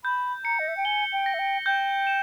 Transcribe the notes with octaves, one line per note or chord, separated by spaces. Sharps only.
B5 G6
A#5 C#7
D#5
E5
G5
G#5 G7
G5
A#6
E5
G5
G5 G6
E7